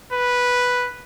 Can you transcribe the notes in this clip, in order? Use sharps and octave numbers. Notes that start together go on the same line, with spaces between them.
B4